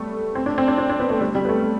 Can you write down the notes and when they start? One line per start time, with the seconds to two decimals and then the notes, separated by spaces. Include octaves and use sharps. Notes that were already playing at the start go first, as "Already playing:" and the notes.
Already playing: G3 A3 B3
0.35 C4
0.46 D4
0.58 C4
0.68 D4
0.78 D4
0.89 D4
1.00 B3
1.10 A3
1.21 G3
1.35 G3
1.45 B3
1.49 A3
1.63 A3